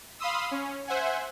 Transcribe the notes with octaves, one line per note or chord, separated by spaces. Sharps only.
F5 B5 C6 D#6 E6
C#4
C5 E5 F#5 G#5